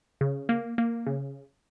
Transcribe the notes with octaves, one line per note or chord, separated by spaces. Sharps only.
C#3
A#3
A#3
C#3